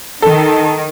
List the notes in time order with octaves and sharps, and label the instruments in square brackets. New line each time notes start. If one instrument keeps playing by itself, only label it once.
[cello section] D#3 [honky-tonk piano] A4